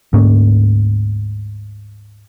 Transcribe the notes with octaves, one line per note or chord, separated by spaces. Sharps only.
D2 G#2 A#3 C#4